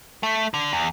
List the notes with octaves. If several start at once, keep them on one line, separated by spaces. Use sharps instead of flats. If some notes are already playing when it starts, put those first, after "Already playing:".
A3
D3
E2